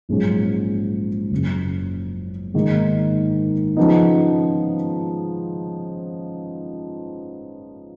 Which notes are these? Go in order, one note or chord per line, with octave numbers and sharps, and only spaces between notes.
A#1 G#2 F#3 C#4
F#1 F#2 C#3
G#2 D#3 A#3 D#4
C#3 F3 B3 D#4